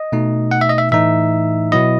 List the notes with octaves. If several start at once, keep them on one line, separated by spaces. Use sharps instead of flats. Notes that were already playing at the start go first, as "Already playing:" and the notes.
Already playing: D#5
B2 A3 D#4
F#5
E5
D#5
E5
A2 E3 A3 D#4 E5
B2 F#3 B3 E4 D#5